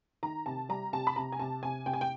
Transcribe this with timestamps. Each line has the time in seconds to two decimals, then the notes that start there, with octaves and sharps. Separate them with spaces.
0.23 D#3 A#5
0.46 C3 A5
0.69 G3 A#5
0.93 C3 A5
1.07 B5
1.16 C3 A#5
1.32 G#5
1.39 C3 A5
1.63 C3 G#5
1.86 C3 G5
1.93 G#5
2.01 G5